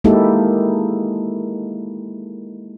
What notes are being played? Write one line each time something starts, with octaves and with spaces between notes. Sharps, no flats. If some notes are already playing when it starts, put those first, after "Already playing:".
G#3 A#3 D#4 E4 G4 A4